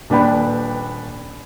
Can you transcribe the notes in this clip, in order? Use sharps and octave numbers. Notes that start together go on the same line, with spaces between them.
D#1 D4 B4 G5 B5